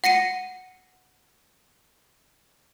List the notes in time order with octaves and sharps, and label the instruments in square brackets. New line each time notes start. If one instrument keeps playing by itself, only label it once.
[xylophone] F#5 A#6 C#7 D#7